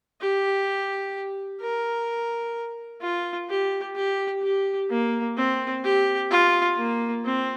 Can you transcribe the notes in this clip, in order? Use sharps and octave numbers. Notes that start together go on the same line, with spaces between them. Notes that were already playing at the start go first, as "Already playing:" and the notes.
G4
A#4
F4
G4
G4
G4
A#3
C4
G4
F4
A#3
C4